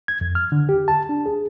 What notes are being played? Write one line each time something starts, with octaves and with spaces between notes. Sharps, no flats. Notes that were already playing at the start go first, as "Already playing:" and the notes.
G#6
F2
F6
D3
G4
A5
D4
G#4